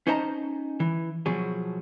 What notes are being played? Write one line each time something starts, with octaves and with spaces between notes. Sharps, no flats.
C#4 D#4 C5 D#5 A5 A#5
E3
B2 F3 F#3 G#4